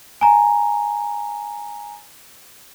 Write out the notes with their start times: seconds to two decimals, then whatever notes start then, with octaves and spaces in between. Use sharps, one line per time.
0.21 G#5 A#5